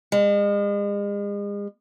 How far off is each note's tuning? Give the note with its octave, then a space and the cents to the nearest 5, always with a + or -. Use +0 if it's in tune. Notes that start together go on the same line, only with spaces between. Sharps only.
G#3 -40